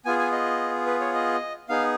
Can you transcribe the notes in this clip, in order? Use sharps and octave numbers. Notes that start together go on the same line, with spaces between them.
B3 F4 G#4 G#5
G#5
D#5
B4
C#5
D#5
B3 D#4 G#4 F5